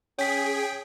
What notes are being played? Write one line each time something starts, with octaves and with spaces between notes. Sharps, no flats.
C#4 G#4 C#5 G5 B6